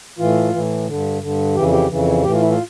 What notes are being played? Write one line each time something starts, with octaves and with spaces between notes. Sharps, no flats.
A2 E3 F4
A2 E3
G2 D3
G2 D3
F2 C#3 E3 G4
G4
F2 C#3 E3
A2 E3 G4
F4
E4
F4